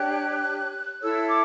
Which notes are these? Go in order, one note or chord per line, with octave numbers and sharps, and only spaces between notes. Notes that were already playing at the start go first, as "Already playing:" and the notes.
Already playing: D4 G4 C#5 F#6
E4 A4 C#5 E6
D6